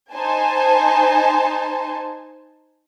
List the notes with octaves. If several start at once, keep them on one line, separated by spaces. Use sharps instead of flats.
D#4 C5 G#5 A5